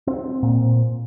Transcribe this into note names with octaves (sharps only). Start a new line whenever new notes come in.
C4
A#2